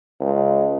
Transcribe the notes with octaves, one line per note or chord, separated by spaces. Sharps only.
C#2